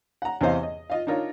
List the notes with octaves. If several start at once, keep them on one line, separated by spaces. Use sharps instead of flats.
F#5 A#5
E2 C3 E3 C5 D#5 F5
D#5
F4 D#5 F5
D4 D#4 F4 A#4 C#5